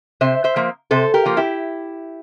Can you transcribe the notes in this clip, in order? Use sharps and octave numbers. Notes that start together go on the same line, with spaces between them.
C3 C5 E5
C5 E5
F3 A#3
C3 A4 C5
G4 A#4
F3 A#3
E4 G4